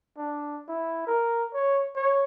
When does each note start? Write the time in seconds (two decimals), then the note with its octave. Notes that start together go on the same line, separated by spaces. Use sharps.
0.17 D4
0.69 E4
1.07 A#4
1.54 C#5
1.96 C#5